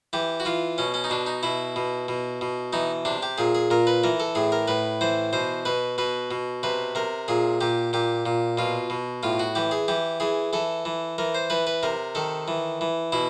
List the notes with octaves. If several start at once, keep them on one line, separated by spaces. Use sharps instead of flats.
E3 G4
F#4
E3 F4
B2 C#4
C#4
D#4
B2 D4
D#4
B2 E4
B2
B2
B2
E3 D#4
C3 D4
G4
A#2 G#4
G#4
A#2 A#4
B4
E3 A#4
A4
A2 G#4
A#4
A2 B4
E3 C5
B2 C5
B2 B4
B2 B4
B2
C3 B4
C3 A#4
A#2 G#4
A#2 G4
A#2 G4
A#2
B2 F4
B2
A2 F4
F#4
E3 G4
G#4
E3 G4
E3 G#4
E3 A4
E3
E3 A#4
C5
E3 B4
B4
C3 A#4
D#3 A4
E3
E3
B2 E4